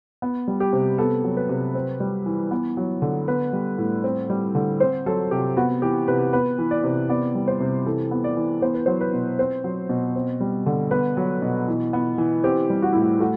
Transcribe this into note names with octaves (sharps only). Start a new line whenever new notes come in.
B3
G3
G4
C3
B3 A4
F#3
B4
C3
C4
G3
E3
B3
F#3
D3
B3 B4
G3
A2
C4
G3
D3
C4 C5
F#3 A4
C3 G4
B3 F#4
E3 G4
C3 B4
B3 B4
E3
D5
C3
B3 D5
G3
C5
C3
E3 A4
B3
D5
E3
B3 C5
B4
F#3 C5
B4
B2
C4 C5
F#3
B2
C4
G3
D3
B3 B4
F#3
B2
E3
B3
E3
C4 G4
G3
F#4
A2 E4
F#4
A3 F#4